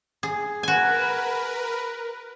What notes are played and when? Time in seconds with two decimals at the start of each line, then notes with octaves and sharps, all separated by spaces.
0.23 G#4
0.63 F#4 A#4 B4 G#5